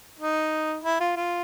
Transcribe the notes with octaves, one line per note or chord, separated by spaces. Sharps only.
D#4
E4
F4
F4